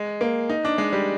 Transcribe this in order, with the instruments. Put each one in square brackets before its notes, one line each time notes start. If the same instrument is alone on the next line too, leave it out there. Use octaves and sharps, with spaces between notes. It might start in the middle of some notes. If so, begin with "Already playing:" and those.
Already playing: [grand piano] G#3
A#3
D#4
D4
G#3
G3